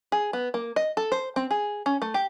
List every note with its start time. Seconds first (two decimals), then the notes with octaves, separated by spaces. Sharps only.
0.12 G#4
0.33 B3
0.54 A#3
0.76 D#5
0.97 A4
1.12 C5
1.36 C4
1.51 G#4
1.86 C#4
2.02 A3
2.14 G4